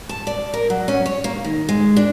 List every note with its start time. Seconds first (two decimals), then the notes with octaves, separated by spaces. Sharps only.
0.09 A5
0.27 D5
0.54 A#4
0.70 F#3
0.88 C#4
1.06 C#5
1.24 A#3
1.44 D#3
1.69 G#3
1.97 D4